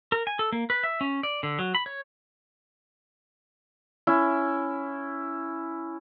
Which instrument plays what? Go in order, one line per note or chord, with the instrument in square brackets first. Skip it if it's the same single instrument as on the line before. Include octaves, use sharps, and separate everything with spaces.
[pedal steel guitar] A#4
G#5
A4
A#3
B4
E5
C#4
D5
D3
F#3
B5
C#5
[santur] C#4 E4